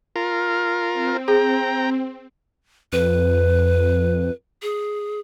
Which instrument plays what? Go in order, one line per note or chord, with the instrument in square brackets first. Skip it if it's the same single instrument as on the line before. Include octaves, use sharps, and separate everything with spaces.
[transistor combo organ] F4 A#4
[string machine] C4
[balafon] G#4 [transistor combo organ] G5 A#5
[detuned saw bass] F2 [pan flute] B4
[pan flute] G#4